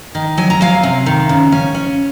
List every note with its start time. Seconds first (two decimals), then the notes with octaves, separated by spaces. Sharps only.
0.15 D#3
0.37 F#3 G#5
0.50 A#5
0.61 F#3 F5 G#5
0.83 C3
1.06 D#3
1.29 C#3
1.52 C#4
1.74 C#4